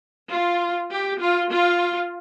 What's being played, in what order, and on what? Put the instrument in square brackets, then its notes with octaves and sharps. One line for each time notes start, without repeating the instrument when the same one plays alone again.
[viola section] F4
G4
F4
F4